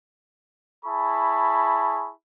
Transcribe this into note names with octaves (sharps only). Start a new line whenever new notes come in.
E4 G#4 A5 B5 C#6